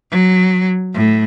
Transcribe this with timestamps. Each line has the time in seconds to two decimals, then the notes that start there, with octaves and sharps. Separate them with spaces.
0.10 F#3
0.95 A2